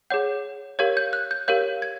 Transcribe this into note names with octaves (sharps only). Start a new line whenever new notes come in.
G#4 C#5 F#5 G6
G4 A#4 C#5 F5 G#6
G6
F#6
G6
G4 A#4 C#5 F5 G6
G#6